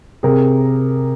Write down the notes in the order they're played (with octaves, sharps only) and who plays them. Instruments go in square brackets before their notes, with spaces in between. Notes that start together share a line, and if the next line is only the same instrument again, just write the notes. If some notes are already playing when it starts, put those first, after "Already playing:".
[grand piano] C3 G#4 A#4